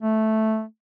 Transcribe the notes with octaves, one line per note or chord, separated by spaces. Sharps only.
A3